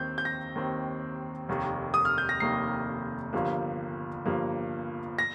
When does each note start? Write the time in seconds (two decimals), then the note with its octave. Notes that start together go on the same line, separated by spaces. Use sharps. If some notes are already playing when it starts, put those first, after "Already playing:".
Already playing: D#2 D#3 C4 G6
0.18 G6
0.25 A#6
0.55 D#2 D#3 C4
1.49 F1 D#2 D#3 A#3
1.94 D#6
2.05 F6
2.18 G6
2.29 A#6
2.40 F1 D#2 D#3 A#3 C7
3.33 G1 G2 F3 A#3
4.26 G1 G2 F3 A#3
5.19 A#6